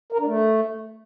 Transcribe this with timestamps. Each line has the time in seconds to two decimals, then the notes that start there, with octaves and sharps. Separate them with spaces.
0.12 A#4
0.19 D4
0.26 A3